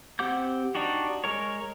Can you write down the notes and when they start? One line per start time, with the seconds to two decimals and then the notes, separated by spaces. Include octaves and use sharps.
0.19 C4 G4 F#5 D6 G6
0.75 D4 D#4 F#4 G4
1.24 G#3 A#4 C#5